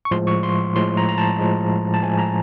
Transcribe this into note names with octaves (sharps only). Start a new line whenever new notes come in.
C#6
A2 F3 G#3 C6
C#6
C6
A2 F3 G#3 C6
A#5
A#5
A5
A2 F3 G#3
A5
A2 F3 G#3 G#5
A#5